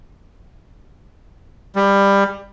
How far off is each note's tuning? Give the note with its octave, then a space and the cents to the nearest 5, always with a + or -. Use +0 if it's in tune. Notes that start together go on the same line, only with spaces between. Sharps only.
G3 +20